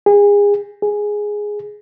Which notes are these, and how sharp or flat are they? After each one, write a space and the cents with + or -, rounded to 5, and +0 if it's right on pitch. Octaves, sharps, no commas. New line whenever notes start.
G#4 -30
G#4 +0